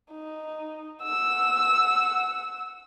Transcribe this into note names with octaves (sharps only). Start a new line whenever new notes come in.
D#4
F#5 E6